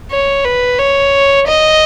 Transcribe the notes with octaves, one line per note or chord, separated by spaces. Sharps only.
C#5
B4
C#5
D#5